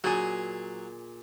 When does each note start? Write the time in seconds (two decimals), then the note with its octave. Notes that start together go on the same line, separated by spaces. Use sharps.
0.04 A#2 F#3 G#4